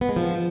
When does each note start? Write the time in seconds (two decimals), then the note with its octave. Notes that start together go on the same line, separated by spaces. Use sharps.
0.01 B3
0.09 G#3
0.16 F3